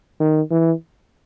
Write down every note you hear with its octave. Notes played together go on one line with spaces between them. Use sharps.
D#3
E3